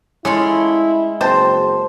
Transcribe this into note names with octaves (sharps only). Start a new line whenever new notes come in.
G#3 A3 C#4 E4 F4
F#1 C4 C5 A5